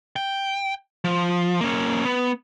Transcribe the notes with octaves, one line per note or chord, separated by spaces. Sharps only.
G5
F3
A#3 C#4
B3